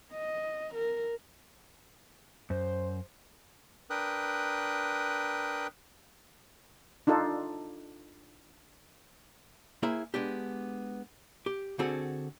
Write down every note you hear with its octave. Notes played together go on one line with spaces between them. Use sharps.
D#5
A#4
F#2 C5
D4 A#4 B4 G5 D#6 F#6
D4 D#4 F4 A4
A#3 E4 G#4 C5 E5
G#3 B3 D4 G4
G4
D3 C4 F#4 G#4 A4